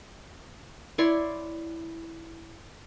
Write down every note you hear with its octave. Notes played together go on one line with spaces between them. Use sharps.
E4 C#5 D5 C6